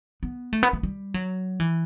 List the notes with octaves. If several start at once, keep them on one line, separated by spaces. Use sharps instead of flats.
B3
A3
B3
A3
G3
F#3
E3